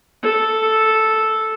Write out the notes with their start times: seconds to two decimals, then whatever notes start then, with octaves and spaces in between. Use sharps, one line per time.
0.23 A4